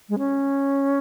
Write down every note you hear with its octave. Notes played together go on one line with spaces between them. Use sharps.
G#3
C#4